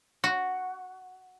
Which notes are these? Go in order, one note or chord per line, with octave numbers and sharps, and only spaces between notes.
F#4